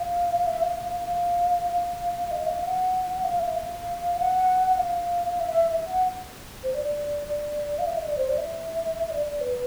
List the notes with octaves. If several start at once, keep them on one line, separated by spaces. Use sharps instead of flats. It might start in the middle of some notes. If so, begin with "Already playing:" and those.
Already playing: F5
E5
F5
F5
F5
F5
F5
D#5
F5
F#5
F5
E5
F5
F#5
F#5
F5
E5
F#5
C5
D5
D5
D5
F5
E5
D#5
D5
C5
D5
E5
D5
B4